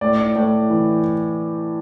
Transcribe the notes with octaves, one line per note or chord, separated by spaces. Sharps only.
A2 D5
A2
E3